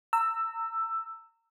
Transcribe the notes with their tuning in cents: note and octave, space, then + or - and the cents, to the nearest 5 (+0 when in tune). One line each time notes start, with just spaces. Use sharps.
A#5 -30 E6 +5